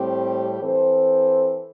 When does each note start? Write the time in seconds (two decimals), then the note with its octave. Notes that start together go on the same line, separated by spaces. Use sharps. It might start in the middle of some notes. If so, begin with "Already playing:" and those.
Already playing: A2 G3 C4 G4
0.60 E3 C4 A4 C5